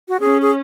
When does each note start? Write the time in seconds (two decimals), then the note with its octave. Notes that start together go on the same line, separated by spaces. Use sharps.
0.09 F#4
0.20 C#4 G#4
0.42 G#4